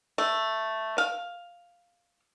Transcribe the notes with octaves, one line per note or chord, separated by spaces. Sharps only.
A3
F5